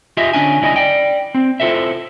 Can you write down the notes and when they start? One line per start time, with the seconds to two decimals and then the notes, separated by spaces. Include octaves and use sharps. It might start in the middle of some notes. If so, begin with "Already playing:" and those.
0.17 F4 G4 G#4 D#5 E5
0.33 D3 C#4 D4 G#5
0.61 D2 G3 E4 D5 D#5 G#5
0.76 D5 G5
1.35 C4
1.60 E4 F4 G4 A4 C5 E5